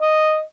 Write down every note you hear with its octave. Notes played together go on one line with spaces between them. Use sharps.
D#5